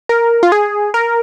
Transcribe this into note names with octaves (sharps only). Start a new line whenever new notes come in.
A#4
F4
G#4
A#4